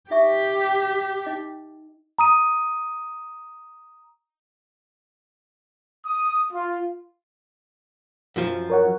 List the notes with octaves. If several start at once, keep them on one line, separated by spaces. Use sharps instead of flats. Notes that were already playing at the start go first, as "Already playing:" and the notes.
D#4 G4 E5 C#6
D#4 D#5
A#5 D#6 D#7
D#6
F4
F#2 F3
A#4 C#5 F#5